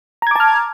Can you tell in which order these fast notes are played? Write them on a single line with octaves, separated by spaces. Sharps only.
A#5 G#6 D6 A5 F6